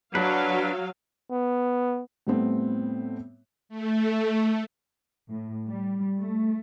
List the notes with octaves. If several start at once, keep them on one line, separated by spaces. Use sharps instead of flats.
F#3 D4 B4 F5
B3
A2 G3 A3 B3 C4
A3
A2
G3
A3